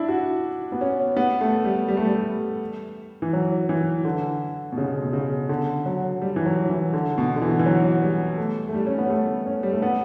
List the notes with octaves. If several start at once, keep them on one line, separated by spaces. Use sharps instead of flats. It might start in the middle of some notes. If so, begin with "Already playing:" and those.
Already playing: D4 E4
F#4
B3
C#4
B3
A3
G3
G3
A3
G3
E3
F#3
E3
D3
B2
C#3
B2
C#3
D3
F#3
G3
E3
F#3
E3
D3
B2
D3
E3
E3
F#3
G3
A3
A3
G3
C#4
B3
A3
C#4
G3
A3
B3